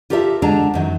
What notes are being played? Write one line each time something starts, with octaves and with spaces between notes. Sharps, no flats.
F4 G4 A4 A#4 C#5 E5
D3 G#3 D4 A#5
F#2 D#3 F#3